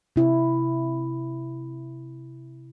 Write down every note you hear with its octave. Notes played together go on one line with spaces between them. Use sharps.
C3 E4